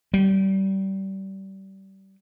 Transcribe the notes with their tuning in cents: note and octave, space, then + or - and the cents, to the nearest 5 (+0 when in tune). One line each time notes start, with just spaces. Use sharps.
G3 -25